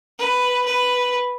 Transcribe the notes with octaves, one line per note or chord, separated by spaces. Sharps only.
B4
B4